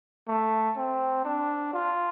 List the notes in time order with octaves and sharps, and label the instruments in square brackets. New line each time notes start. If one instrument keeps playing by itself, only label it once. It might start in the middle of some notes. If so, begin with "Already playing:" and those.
[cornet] A3
C4
D4
F4